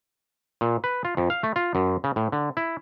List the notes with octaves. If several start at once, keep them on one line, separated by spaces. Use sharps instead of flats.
A#2
B4
F4
F2
F5
A3
F4
F#2
C#3
A2
D3
E4